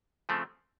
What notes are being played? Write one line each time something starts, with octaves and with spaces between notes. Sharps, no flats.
C#3 F3 A3 C4